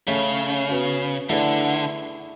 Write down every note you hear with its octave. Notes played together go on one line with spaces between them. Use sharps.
C#3 A3 C#4 G#4
B3 F#4 C#5
D3 A3 E4 G#4 B4 D5